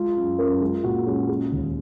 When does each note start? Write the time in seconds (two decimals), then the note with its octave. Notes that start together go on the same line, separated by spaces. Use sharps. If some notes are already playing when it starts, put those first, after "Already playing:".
Already playing: G#3 F4
0.17 F#2
0.39 F#2 A#4
0.61 G#3 F4
0.84 A#2 F#4
1.06 G#3 C#4
1.28 G#3
1.52 D#2